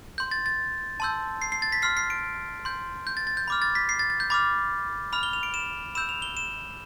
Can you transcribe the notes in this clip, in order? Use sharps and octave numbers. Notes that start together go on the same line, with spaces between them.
C6 G6
A6
A6
A5 C6 E6 G6
C7
C7
A6
B6
C6 F6 C7
C7
D7
C6 G6
G6
A6
A6
G6
B5 D6 F6
A6
B6
C7
A6
A6
G6
B5 D6 F6 A6
B5 F6 F7
G7
F7
D7
E7
B5 E6 G6 E7
F7
G7
E7